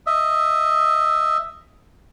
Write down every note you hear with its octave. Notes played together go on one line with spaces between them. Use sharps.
D#5 E5